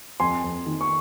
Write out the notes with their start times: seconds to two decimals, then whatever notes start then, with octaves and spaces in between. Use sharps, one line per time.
0.20 F2 G#5 C6
0.44 F2
0.66 D#3
0.81 C#6